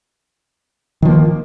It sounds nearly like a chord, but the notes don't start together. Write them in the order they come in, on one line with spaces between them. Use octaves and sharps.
D#3 F3 A#3